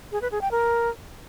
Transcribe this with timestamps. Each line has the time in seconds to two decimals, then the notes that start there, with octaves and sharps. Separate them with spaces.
0.12 G#4
0.22 B4
0.32 G#4
0.41 G5
0.51 A#4